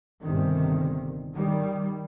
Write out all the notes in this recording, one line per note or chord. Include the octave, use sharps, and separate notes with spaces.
G1 C3 D#3
D#3 G3